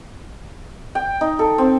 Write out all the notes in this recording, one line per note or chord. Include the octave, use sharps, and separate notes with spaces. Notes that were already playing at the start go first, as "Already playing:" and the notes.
G5
D#4
A4
C4